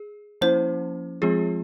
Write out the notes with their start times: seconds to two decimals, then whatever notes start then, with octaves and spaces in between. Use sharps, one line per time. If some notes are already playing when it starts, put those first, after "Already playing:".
Already playing: G#4
0.41 F3 A#3 C#4 E4 C5
1.22 F3 G#3 C4 F4 G#4